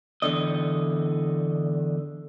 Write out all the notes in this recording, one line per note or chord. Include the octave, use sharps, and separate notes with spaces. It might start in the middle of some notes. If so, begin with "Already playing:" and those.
E2 G2 D3 D#5